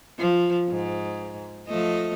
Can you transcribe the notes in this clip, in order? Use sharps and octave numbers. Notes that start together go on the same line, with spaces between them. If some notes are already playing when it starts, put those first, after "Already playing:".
F3
G#2
F3 A3 D#5